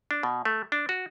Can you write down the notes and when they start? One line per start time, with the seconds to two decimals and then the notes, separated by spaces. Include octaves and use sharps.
0.11 D4
0.23 B2
0.45 A3
0.72 D4
0.89 F#4